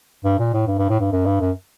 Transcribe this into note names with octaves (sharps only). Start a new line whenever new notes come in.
G2
A#2
A2
G2
G2
A2
G2
F#2
G2
F#2